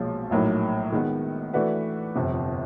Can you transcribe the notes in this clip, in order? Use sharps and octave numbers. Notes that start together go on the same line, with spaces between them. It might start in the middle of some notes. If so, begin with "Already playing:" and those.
Already playing: B1 A#2 F3 G#3
A#1 A2 F#3 A#3 D#4
D#3 G#3 B3
E3 A3 D4 F#4 B4
G1 F2 C3